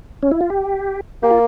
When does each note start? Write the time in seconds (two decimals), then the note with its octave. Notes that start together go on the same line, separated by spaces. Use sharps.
0.23 C#4
0.31 E4
0.41 F4
0.50 G4
1.23 A#3 G4
1.31 F4